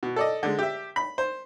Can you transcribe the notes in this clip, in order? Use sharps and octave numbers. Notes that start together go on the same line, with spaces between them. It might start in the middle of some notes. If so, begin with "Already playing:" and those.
B2
A4 D5 D#5
D3 G#3
G4 E5
B5
C5